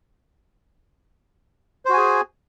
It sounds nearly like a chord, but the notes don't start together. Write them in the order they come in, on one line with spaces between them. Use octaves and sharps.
C5 F#4 G#5 G#4